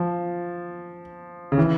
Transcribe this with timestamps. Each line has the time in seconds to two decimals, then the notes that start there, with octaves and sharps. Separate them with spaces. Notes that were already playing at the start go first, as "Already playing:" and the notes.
Already playing: F3
1.52 C#3
1.58 E3